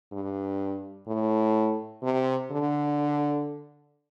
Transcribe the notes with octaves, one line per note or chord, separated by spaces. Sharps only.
G2
A2
C3
D3